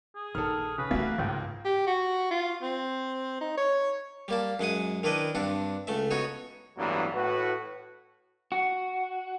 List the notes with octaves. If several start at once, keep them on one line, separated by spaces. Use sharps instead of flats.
G#4
A#1 D#3 A4 F6
C#3 B4
E3 A3 A#3 F#4 E5
G#1 C#2 G#2 G5
G4
F#4
F4
C4
D#4
C#5
G3 A#3 A5
F#2 G#3 F#5 D#6
D#3 D4 E4 B4 D#5
G2 C4 D4 F#5
C#2 A3 E5
B3 D#4 F#4 C#5
A1 G2 E3 F#3 A#3 B3
A2 F#4 B4
F#4